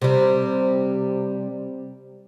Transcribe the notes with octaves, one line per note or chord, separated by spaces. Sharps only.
C3 G3